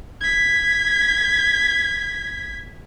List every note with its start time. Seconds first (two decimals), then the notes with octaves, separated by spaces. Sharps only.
0.21 G#6 B6